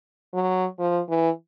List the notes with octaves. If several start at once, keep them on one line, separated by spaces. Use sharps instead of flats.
F#3
F3
E3